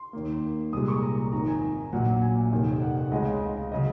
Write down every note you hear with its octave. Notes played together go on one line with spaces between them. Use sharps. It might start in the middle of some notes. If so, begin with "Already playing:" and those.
Already playing: C6
D#2 D#3 A#3
C2 A#2 F3 G#3 D#6
C#6
A#5
A#5
G#1 G#2 D#3 A#5
G#5
A#1 A#2 F#3 A#3 F#5
G#5
F1 D#2 D#3
F#5
F#5
C#2 C#3 G#3 D#5
F5
C#3 F#3 D#5